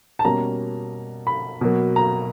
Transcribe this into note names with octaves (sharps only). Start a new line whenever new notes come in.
A5
B2 G3 A#3 C#4 A#5
B5
B2 F#3 A#3
A#5